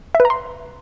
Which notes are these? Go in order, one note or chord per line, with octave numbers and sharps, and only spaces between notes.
E5
B4
A#5
C6